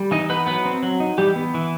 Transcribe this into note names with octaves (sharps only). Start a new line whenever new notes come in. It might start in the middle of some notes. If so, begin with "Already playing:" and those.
Already playing: G3
E3 D#4 D#5
B3 D#4 B4
F#3 B3 B4
C4
F#3
D#4
E3 G3 G4
B3
E3